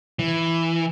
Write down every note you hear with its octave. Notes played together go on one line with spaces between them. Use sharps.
E3